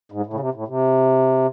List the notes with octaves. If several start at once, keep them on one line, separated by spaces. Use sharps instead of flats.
G#2
A2
C#3
C3
A2
C3